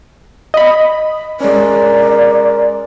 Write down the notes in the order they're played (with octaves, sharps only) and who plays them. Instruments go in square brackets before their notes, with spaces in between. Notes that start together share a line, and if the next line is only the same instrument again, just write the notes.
[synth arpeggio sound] D#5 B5
[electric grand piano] G#3 C#4 [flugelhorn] A#4 [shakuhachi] D5